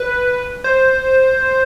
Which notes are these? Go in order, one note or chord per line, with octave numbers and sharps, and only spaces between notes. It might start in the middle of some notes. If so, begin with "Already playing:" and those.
Already playing: B4
C5